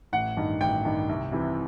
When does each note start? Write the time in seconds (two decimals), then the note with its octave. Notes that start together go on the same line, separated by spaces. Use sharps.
0.13 A1 F#5
0.37 G2 D#3
0.61 A1 G5
0.85 G2 D#3
1.09 C2
1.32 C3 E3